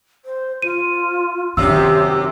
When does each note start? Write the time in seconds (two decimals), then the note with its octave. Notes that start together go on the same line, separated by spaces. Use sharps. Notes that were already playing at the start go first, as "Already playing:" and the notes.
0.25 C5
0.62 F4 D#7
1.57 F#2 C3 D#3 F4 G4 E6